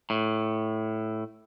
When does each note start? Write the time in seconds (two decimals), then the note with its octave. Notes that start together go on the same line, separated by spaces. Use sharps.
0.10 A2